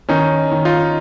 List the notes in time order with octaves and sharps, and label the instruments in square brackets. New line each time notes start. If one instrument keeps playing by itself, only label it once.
[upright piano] D#3 [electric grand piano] C#4 D#4
[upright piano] D#3
[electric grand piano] D#4 F4